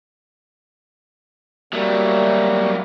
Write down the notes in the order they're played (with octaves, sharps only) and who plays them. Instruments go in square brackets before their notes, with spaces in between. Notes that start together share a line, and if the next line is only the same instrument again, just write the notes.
[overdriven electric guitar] F#3 A3 [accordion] G3 A#3